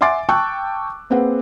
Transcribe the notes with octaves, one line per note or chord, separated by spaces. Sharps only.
E5 F#5 G#5 C6 D6 A6
G5 A5 C#6 E6 F#6
A#3 C4 G#4 B4 F#5